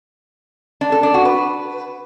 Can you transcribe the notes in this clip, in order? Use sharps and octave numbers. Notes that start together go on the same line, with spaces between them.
D4
A4
D4
F#4
B4